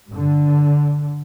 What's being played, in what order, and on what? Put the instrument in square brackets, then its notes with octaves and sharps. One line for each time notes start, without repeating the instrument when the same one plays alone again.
[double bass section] G2 D3